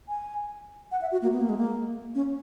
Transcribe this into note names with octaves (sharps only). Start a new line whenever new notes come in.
G#5
F#5
E5
F#4
A#3
B3
A#3
G#3
A#3
C#4